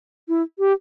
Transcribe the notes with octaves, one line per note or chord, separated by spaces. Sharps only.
E4
G4